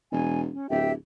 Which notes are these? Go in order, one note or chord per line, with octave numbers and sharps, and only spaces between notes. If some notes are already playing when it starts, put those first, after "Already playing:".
E1 G#5
C#4
D1 G4 E5 G5